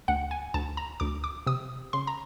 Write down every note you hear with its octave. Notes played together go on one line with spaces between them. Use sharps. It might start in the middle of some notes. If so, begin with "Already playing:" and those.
D2 F#5
G#5
D2 A5
A#5
D2 D6
D6
C3 D#6
C#3 C6
A#5